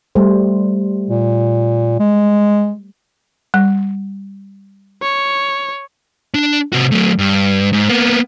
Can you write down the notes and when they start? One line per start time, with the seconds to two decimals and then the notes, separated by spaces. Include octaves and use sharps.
0.15 G3 A3 C5
1.10 A#2
1.99 G#3
3.54 G3
5.02 C#5
6.34 D4 A5
6.73 C3 F#4
6.92 F#3 A3
7.19 G2
7.73 G#2
7.89 A#3 B3